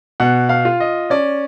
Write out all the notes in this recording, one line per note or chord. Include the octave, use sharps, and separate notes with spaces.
B2 F#5
F5
F4
D#5
C#4 D5